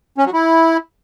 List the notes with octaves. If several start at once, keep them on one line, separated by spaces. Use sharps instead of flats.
C#4
F#3
E4